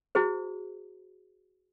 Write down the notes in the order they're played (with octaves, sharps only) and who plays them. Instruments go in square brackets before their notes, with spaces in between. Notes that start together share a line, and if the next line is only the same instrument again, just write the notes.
[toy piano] E4 F#4 G#4 C5